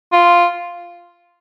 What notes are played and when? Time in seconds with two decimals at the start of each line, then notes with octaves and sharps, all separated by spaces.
0.13 F4